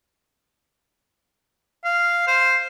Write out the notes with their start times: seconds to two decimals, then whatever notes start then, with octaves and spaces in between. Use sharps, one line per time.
1.85 F5
2.28 C5